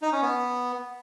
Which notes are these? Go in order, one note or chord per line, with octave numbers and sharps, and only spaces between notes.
D#4
C#4
B3